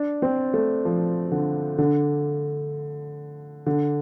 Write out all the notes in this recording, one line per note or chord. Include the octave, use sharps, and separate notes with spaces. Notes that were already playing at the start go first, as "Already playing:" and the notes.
Already playing: D4
C4
A3
F3
D3
D3
D3